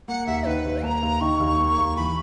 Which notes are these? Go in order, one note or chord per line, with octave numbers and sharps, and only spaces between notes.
A#3 F#5
D#2 E5
D#3 B4
D#2
A#3 A#5
D#2
D#3 C#6
D#2
A#3
D#2
E3 B5